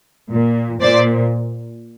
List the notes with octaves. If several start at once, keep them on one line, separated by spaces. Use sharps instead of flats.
A#2
A#2 C5 D5